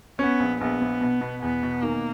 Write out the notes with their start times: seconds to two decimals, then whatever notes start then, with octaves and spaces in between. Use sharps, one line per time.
0.19 B3 C#4
0.40 A#1
0.61 A#1 B3
0.81 A#1
1.01 B2
1.21 B2
1.42 E2 B3
1.63 B2
1.82 D#3 A#3